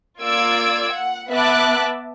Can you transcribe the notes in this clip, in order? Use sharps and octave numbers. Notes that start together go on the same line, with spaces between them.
A#3 F4 D5 E6 G#6 D7
F#5
B3 E5 A5 D6 F#6